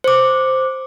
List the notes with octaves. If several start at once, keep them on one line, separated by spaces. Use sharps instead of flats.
C5 D6